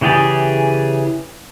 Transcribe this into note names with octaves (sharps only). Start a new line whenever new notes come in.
C#3 E3 G4 G#4 D5